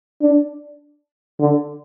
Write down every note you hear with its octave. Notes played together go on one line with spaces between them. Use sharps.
D4
D3